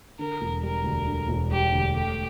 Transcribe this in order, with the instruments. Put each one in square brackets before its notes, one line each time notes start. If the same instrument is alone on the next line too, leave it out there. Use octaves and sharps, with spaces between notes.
[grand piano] D3 [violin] A#4
[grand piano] E1
[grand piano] G3 [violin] A#4
[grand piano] D2
D3
E1
[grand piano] G3 [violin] G4
[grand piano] D2
[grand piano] A3 [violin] G4